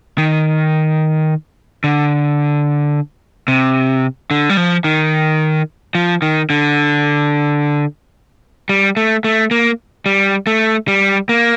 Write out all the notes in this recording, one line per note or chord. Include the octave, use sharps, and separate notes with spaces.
D#3
D3
C3
D3
G3
F3
D#3
F3
D#3
D3
G3
A3
A3
A#3
G3
A3
G3
A#3